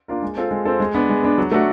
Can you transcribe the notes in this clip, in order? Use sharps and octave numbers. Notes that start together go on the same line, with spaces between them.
A#3 D4 F4 A#4
G#3
C4 F4 A4
G#3
C4 F4 A4
G#3
B3 D4
G#3
B3 D4
F#3
A3 D4 F#4